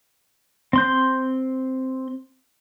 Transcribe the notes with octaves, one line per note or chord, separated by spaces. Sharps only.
C4 C6 G6